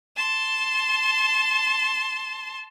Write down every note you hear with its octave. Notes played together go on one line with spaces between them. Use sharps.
A5 C6